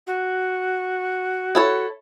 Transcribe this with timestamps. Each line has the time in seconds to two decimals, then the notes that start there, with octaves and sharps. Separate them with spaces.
0.07 F#4
1.55 E4 A4 C#5